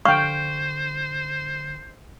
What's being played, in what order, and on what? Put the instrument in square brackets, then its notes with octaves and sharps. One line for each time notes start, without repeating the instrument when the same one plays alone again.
[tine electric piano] D3 C7 [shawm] C5 [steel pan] F5 G5 [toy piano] C#6